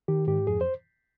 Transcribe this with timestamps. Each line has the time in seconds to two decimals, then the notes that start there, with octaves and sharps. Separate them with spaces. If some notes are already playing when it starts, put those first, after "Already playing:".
0.08 D#3 G4
0.27 G#2 G4
0.47 F2 G#4
0.61 C5